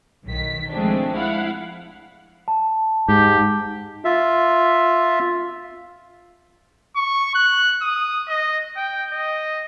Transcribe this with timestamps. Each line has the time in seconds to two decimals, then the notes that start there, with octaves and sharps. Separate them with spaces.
0.26 B1 D#3 B6
0.71 F3 G#3 A3 C4 D4
1.15 E4 F5 F#5
2.48 A5
3.09 G#2 G4
4.05 F4 E5
6.96 C#6
7.35 F#6
7.82 D#6
8.28 D#5
8.77 G5
9.12 D#5